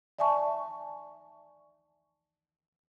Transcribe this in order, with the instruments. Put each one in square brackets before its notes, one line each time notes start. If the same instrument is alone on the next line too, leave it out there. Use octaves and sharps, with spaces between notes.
[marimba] D5 E5 G#5 A5 C#6